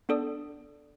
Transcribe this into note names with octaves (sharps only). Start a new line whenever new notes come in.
B3 D4 A4 D5 D#6